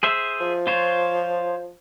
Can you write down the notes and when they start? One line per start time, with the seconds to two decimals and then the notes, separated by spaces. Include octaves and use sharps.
0.03 G#4 C5 E5
0.40 F3
0.67 F4 C5 C#5